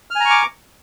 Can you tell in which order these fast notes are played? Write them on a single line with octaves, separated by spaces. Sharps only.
F6 G#5 A#5 C#6 D6